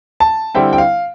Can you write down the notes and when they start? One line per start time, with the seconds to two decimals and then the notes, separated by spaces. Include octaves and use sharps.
0.20 A5
0.55 D3 G3 C4 E4 G5
0.73 G5
0.78 F5